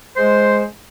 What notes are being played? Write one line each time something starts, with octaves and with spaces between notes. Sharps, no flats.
G#3 C5